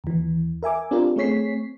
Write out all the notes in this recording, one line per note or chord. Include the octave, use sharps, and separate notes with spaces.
D#2 E3
A#4 E5 G#5 D6
C4 D4 F4 G4 A#4
A3 C4 G#4 C#5 B6 C7